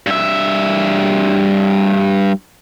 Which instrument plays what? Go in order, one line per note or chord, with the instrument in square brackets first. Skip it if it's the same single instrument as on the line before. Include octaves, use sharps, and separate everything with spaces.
[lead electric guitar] G2 E5